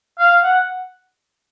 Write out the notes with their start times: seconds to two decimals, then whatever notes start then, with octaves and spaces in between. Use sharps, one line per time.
0.19 F5
0.43 F#5